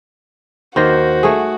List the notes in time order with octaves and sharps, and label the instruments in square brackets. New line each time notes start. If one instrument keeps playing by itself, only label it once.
[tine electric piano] D#2 C5 A#6 [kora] D#3 A#3 [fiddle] F#4
[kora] A3 G#4